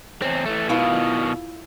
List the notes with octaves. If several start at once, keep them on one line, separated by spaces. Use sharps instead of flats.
E2 C4 C#5
E3 A3
B2 D#3 E4 F4 B4